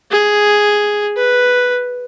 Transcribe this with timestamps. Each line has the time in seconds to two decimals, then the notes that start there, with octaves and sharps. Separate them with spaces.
0.11 G#4
1.17 B4